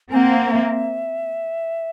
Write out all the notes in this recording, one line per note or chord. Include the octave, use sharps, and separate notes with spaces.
A#3 C4 F#5 G#5
E5